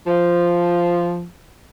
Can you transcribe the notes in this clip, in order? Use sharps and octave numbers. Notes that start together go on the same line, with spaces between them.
F3